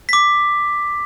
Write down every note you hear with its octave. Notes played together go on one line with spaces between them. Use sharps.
D6 B6